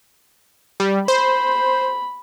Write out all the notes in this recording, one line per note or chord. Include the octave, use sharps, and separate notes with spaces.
G3
C5 B5